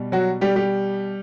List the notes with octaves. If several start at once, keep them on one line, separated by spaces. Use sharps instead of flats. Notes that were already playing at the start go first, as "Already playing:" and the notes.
Already playing: B2 G3
F#3 F#4
G3 G4
G3 G4